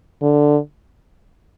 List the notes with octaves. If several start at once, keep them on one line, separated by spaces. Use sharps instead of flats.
D3